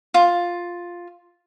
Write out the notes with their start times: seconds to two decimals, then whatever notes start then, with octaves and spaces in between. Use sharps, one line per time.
0.14 F4